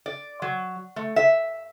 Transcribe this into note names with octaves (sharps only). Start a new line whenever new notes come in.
D5
F#3
A3
E5